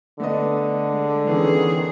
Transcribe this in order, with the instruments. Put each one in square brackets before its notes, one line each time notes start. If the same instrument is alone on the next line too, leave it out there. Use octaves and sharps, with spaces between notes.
[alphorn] D3 [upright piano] A3 B3 D#5
[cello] G#3
[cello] D#3 G#4 [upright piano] E3 B3 C#4